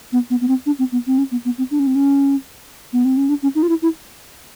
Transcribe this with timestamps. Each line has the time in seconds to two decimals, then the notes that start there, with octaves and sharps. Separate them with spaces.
0.13 B3
0.30 B3
0.41 B3
0.48 C4
0.66 D4
0.79 C4
0.92 B3
1.07 C4
1.18 C#4
1.31 B3
1.45 B3
1.58 C4
1.71 D4
1.79 C#4
1.87 C4
1.95 C#4
2.93 B3
3.05 C4
3.17 C#4
3.29 D4
3.43 C#4
3.55 D#4
3.63 F4
3.69 E4
3.82 E4